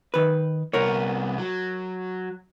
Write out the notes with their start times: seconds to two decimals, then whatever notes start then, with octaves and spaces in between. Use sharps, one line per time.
0.14 D#3 B4
0.73 C2 B3 A#4 C#5
1.38 F#3